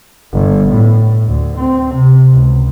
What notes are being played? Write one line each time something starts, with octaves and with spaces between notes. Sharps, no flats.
G1
A2
D2
C4
C3
C#2